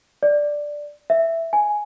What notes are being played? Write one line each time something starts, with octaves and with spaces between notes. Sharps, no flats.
D5
E5
G#5